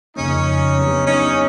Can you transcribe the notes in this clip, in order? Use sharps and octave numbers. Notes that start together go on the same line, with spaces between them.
F2 C#3 F3 A#3 C#4 D#4
F#3 B3 D4 G4
C#4 D#4